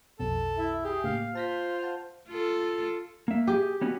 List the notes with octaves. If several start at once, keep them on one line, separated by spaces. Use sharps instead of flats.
B1 F2 B2 A4
E4 E5
G4 G#4
A2 C#3 A#3 F5
F4 C5 A5 A#6 B6
F#5 A5
F4 A4
A#3 E5
G4 G#4
B3 C#4 F#4